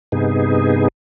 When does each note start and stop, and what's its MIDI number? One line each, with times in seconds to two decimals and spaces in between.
0.12 0.88 43
0.12 0.88 48
0.12 0.88 59
0.12 0.88 63
0.12 0.88 68